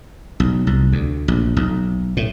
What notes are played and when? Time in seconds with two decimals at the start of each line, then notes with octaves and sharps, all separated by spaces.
0.40 B1
0.67 C2
0.92 D2
1.28 A#1
1.57 B1
2.17 A2